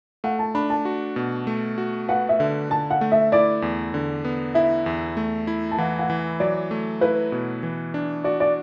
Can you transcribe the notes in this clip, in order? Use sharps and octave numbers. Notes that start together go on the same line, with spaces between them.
A3 F#5
A5
D4 B5
A5
F#4
B2
A3
F#4
B4 F#5
E5
D3
D3 A5
F#5
A3
E5
E4 D5
E2
D3
B3
E4 E5
E2
A3
E4
A5
E3 F#5
F#5
E3
F#3 D5
A3
E4 B4
B2
E3
D4
F#4 D5
D5